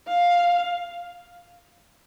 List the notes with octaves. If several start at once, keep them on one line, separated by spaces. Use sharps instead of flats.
F5